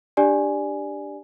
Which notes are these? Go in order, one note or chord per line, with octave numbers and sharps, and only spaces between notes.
D4 G4 D5 G#5